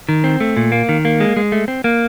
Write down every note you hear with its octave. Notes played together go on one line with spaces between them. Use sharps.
D#3
C4
A3
A#2
A#3
D#3
A#3
G#3
G#3
A3
C4
A#3